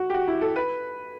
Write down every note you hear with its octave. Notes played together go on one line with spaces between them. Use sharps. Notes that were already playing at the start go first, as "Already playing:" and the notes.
Already playing: F#4
G4
F#4
E4
A4
B4